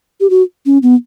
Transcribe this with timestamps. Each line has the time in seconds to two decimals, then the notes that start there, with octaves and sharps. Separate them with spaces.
0.20 G4
0.30 F#4
0.66 C#4
0.83 B3